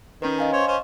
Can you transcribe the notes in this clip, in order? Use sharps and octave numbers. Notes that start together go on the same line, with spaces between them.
D#3 C#4 B4
D#5 F5 G#5
C5 C#5
C#4 C5